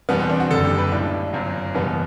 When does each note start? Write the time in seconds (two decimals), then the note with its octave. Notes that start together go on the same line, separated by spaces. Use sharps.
0.09 E2 B2 G3 B3
0.20 C4
0.30 D4
0.40 F#4
0.50 F#1 F#2 D3 A4
0.64 G4
0.78 B4
0.92 B1 A2 G3 D4
1.33 G1 F#2 F#3
1.75 F#1 E2 B2 G3 B3